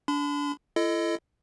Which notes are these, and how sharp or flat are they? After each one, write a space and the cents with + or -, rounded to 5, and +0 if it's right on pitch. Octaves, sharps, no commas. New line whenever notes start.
D4 -25 B5 +45
E4 +40 A4 +0 D#5 +0